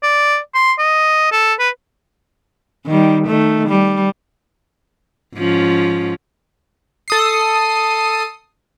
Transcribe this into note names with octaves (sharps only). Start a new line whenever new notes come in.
D5
C6
D#5
A4
B4
D#3 G3
D#3 A3
G3
G#2 F3 C#4
A4 D#6 C7